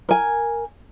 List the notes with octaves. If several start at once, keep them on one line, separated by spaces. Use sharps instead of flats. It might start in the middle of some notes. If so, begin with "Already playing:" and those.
A#4 G#5